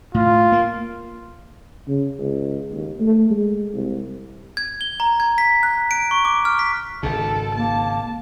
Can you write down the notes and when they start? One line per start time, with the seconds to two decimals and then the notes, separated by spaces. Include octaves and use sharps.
0.14 A2 F4
0.52 A#3
1.88 C#3
2.19 C#2
2.72 D#2
3.00 A3
3.30 G#3
3.73 C2
4.57 G#6
4.81 G7
5.00 A#5
5.20 G#6
5.38 B6
5.63 F#6
5.91 D7
6.11 C#6
6.25 D6
6.45 F6
6.59 B6
7.03 G#1 G#2 C#3 A4
7.55 A#3 A5